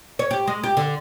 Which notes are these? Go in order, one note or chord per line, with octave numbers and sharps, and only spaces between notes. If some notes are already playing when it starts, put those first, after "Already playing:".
C#5
G4
G#3
G4
D3